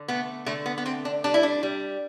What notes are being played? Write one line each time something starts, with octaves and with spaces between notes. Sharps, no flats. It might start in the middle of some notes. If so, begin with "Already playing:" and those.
Already playing: D3
A3 B3
D3 A3
B3
B3
A3 C4
D4
G3 D4
E4
D4
G3